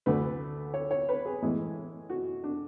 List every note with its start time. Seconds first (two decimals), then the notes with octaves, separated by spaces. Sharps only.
0.06 D2 D3 A3 B4
0.74 C#5
0.91 C#5
1.09 B4
1.25 G#4
1.42 A2 E3 G#3
2.10 F#4
2.44 D4